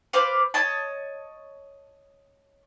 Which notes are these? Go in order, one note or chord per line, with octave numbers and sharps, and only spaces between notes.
B4 C5 D5 F5
C#5 D#5 A5